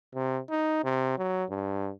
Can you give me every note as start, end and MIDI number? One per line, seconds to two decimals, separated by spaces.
0.15 0.41 48
0.50 0.79 63
0.84 1.17 48
1.18 1.44 54
1.50 1.91 43